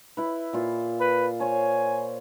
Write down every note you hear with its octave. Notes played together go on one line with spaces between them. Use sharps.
E4 B4
A#2 F4
B4
C5 C#5 G#5